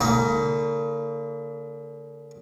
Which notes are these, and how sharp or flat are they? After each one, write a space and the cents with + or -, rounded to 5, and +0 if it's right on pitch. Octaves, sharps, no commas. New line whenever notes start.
D3 -45 A#3 -25 D#4 +25